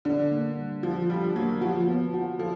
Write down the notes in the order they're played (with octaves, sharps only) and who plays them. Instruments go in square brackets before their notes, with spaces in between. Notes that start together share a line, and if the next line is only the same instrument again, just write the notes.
[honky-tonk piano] D3 [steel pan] D4
[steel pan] A#3
G3
[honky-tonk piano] F3 [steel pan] F4
[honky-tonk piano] G3 [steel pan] F4
[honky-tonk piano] F#3 [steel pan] A#3
[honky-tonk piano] F3 [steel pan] F#4
[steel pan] B3
F#4
[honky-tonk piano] F3 [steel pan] A4